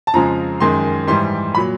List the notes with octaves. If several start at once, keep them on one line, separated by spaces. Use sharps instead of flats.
A5
F2 C#3 F3 G#3 A#5
F#2 D#3 G#3 C6
G#2 E3 G3 C6
A#2 F#3 B5